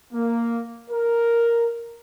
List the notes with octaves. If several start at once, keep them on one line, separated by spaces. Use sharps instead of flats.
A#3
A#4